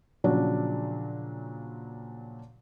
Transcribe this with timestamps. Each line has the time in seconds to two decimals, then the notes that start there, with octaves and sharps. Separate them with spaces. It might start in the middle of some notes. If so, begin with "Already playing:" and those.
0.24 A#2 C#3 F3 F#3 D4